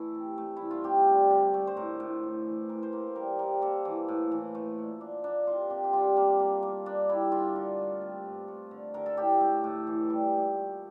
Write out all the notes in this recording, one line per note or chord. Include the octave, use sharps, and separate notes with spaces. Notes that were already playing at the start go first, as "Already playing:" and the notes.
Already playing: E3 A3 E4
C3
A3
E4
G2
F4
C3 G4
G3
D3
A3
C5
A2 A#4
A2
A2
E3
E3 A#4
C5
A#3 A#4
G3 A#4
G3 A#4
A#3 A4
E3
A2
E3
A3
A#2
A#3 D4
A#3 D4
C3 F4
C3 G4
G4
G3 F4
A#3
A#3
A#3
A#3 D4
G3 E4
D3 F4
D3
A3
C3
G2
A3
D3
D3 A#4
A4
A2 G4
A3
A2
E3
G3
A#2
A3